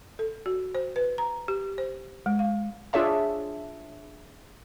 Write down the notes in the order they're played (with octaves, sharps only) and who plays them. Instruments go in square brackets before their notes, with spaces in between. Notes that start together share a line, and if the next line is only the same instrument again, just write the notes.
[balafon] A4
F#4
C5
B4
A#5
G4
C5
G#3
F5
[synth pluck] D4 F4 G#4 C#5 E5 A5